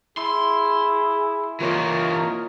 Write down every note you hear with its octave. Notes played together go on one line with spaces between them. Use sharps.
E4 G#4 C6
E3 A#3 F4 A#4 C#5 D#5